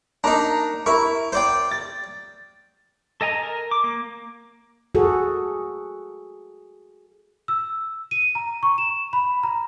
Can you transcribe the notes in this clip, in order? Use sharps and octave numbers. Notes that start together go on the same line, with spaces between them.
A#3 D4 D#4 A#5
E4 A#4 C#6
C5 D5 G5
A6
A4 D#5 G#5 A#5
A#4
D6
A#3
F#4 G#4 A4
E6
D#7
A#5
C#6
E7
B5
A#5